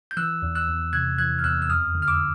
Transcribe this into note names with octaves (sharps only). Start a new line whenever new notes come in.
G6
E3 E6 F#6
E2
E6 F#6
E2
C3 F#6 G#6
E3 F#6 G#6
F6
E2 E6 F#6
E6
F2 D#6 F6
D3
F6
D6 E6